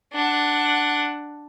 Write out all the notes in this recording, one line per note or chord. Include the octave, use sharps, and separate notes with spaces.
D4 F#5